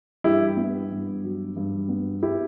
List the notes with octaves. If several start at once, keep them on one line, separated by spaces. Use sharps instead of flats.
G2 E4 G4
B3
G2
F#3
G2
B3
E4 G4